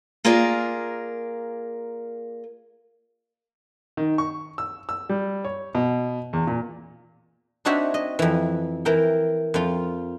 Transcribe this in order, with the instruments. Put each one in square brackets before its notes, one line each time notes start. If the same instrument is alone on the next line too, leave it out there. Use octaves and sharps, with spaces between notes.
[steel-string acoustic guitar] A#3 F4 G#4 A#4 D5
[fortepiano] D#3
C#6
E6
E6
G3
C#5
B2
E2
A#2
[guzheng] C4 D4 D#4 F#4 C#5 E5
D#5
F2 E3
E3 A#4 G5
F2 F4